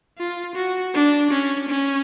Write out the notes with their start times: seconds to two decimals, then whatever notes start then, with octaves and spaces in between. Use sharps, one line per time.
0.18 F4
0.56 F#4
0.94 D4
1.31 C#4
1.69 C#4